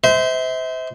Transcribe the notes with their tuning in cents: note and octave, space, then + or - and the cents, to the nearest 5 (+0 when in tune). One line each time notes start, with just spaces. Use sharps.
C5 -25 E5 -40